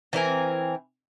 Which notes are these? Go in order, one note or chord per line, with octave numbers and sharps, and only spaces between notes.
E3 C4 A#4 G#5